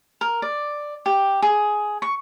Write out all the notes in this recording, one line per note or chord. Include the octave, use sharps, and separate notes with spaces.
A#4
D5
G4
G#4
C#6